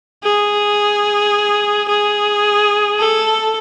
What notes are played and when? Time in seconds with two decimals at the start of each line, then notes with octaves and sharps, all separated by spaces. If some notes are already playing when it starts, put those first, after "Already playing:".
0.24 G#4
1.88 G#4
2.99 A4